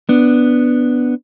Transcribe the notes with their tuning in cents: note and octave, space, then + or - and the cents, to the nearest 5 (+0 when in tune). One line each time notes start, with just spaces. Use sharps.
B3 +0 D4 +0